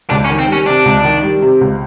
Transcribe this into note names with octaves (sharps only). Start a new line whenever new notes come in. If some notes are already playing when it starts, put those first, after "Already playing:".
C#2 D4
C#4
D#3
C4
G3 C#4
C3 D4
C#2
D#3
G3
C3
C#2